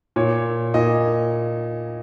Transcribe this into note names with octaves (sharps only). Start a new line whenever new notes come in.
A#2 C#5
A#2 D#5